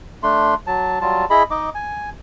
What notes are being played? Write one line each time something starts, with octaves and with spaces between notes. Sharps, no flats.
A3 D4 C6
F#3 A5
F#3 G3 F4 A5
E4 G#4 D#5 B5
D#4 D#5 D6
G#5